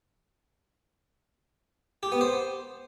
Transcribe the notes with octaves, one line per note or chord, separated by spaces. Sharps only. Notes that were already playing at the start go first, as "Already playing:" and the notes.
G4
B3
C5